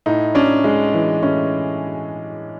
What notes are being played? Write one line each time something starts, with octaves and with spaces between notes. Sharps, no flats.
A2 D#4
C#4 D4
G#3
E3
A2 C#4